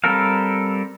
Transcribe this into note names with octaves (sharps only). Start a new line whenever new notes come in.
G3 C4 A4 A#4 F5